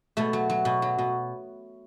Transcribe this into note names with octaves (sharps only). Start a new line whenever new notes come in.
B2 A3
F#3
F#3
B2
F#3
B2